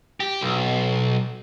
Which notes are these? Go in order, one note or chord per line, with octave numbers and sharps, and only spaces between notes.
G4
B1